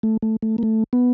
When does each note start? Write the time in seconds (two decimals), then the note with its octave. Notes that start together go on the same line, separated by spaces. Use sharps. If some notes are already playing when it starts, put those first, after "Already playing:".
0.03 A3
0.22 A3
0.42 A3
0.58 A#3
0.63 A3
0.93 B3